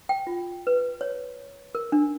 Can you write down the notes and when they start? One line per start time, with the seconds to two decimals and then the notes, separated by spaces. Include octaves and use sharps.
0.09 G5
0.27 F4
0.67 B4
1.01 C#5
1.75 A#4
1.92 D4